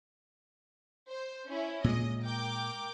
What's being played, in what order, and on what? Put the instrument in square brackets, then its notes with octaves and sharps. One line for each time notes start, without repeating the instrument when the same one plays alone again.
[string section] C5
C#4 E4
[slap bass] A#2 G#3 [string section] D#5
[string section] A#4 G5 D6